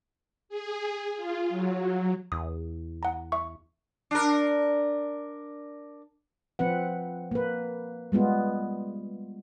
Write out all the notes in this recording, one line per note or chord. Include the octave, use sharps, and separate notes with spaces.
G#4
F4
F#3
E2 D#6
F#5 A#5
E5 C#6
D4 A#4
F3 C4 B4 F#5
A#3 B4
G3 G#3 B3 F4